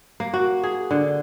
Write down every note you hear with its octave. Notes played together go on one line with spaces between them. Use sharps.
A#3
F#4
G#4
D3